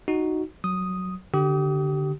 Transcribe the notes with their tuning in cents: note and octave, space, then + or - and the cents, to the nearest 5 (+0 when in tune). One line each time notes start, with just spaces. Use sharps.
D#4 +0 F#4 +0
F#3 +0 D#6 +0
D3 +0 G4 -30 D#6 +25